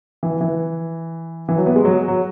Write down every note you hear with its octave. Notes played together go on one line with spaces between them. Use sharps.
E3
E3
E3
F#3
B3
G#3
F#3
F#3